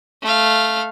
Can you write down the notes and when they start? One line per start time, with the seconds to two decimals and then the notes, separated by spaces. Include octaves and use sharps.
0.22 A3 F5